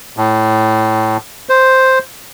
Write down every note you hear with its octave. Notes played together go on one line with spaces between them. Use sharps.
A2
C5